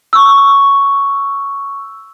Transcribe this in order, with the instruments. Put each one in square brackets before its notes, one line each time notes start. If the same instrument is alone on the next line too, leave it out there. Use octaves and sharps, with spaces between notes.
[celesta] C#6 E6